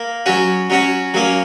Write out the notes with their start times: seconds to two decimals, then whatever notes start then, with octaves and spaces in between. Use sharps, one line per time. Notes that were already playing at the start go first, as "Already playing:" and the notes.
Already playing: A#3
0.26 F#3 C#4 F#4
0.70 F#3 C#4 F#4
1.14 F#3 A#3 C#4